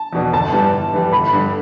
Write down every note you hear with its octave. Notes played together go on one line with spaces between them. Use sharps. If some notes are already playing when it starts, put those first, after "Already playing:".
Already playing: A5
E2 B2 B3 D4
G1 A5
G2 E3 G3
G1
G2 E3 G3
G1 B5
G2 D3